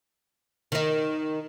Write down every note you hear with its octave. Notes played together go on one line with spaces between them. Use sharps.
D#3 D#4